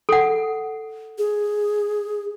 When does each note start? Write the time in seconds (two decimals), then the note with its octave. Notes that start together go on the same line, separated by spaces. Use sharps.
0.09 A4 F#5
1.18 G#4